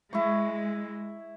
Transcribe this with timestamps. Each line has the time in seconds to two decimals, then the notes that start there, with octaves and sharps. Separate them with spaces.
0.13 G#3 E4 C#6